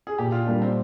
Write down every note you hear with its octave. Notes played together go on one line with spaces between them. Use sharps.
G#4
A#2 G4
F4
G3 A#3 D4
C4